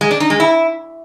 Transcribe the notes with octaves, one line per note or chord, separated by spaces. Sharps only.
G#3
D4
D#4
G#3
E4